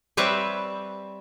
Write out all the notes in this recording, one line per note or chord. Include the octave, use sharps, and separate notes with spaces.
G3 C4 B4 C#5 E5 G5